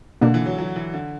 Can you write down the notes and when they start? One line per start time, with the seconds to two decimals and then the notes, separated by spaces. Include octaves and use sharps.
0.21 B2 D3 A#3 D4
0.34 E3
0.46 F#3
0.58 F#3
0.76 E3
0.94 D3